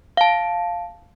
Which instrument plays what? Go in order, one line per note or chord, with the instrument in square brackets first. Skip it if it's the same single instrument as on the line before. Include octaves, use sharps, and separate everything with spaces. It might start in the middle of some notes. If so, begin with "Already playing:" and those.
[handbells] F5 A5